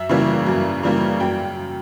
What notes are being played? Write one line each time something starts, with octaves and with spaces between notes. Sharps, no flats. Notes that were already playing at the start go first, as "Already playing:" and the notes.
Already playing: F#2 E5
C#3 E3 G3 A#3
F#2
C#3 E3 G3 A#3
F#2 G5